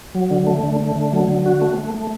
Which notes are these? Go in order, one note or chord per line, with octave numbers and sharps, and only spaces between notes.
F#3
D3
A3
D3
A3
D3
F#3
D3
F#4
A3
A3
A3